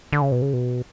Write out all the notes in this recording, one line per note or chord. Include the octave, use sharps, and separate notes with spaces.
D3
C#3
B2
C#3
B2